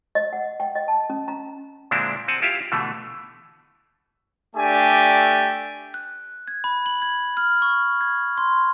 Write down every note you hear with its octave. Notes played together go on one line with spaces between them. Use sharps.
D#5
F#5
G5
D#5
A5
C#4
A#5
A#2 D3 G#3 C4 D4 E4
C4 F#5 G#5 A5
E4 F4 G4 E5 F5
B2 D3 E3 A3
A3 D4 G4 D5 G#5
F#6
G#6
B5
F#7
G#6
F6
C#6
G#6
C6